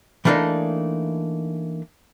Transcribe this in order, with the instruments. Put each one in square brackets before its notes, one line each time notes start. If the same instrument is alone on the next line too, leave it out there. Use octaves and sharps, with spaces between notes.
[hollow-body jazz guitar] E3 A3 A#3 D4 D#4